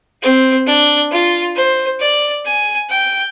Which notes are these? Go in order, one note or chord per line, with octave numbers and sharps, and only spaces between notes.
C4
D4
F4
C5
D5
G#5
G5